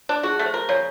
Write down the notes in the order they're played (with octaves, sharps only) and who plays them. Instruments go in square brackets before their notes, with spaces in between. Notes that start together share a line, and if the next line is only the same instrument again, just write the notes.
[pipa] D4
[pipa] F#4 [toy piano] G#4
[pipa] A3
[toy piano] C5
[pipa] A#4
[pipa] C#3 [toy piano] C#5